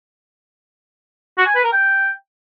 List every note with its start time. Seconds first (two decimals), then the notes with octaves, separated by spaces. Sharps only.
1.38 F#4
1.47 G#5
1.55 B4
1.64 A#4
1.73 G5